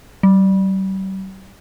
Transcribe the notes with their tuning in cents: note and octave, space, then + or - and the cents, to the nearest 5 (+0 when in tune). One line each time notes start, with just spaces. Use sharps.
G3 -40